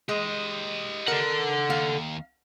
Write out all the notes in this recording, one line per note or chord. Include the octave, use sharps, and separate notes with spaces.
G#3 G4 D#5
A4 A#4 F#5
D#2 F5